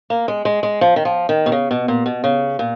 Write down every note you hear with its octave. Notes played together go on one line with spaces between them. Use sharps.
A#3
G#3
G#3
G#3
F3
D#3
F3
D#3
B2
C#3
B2
A#2
B2
C#3
A#2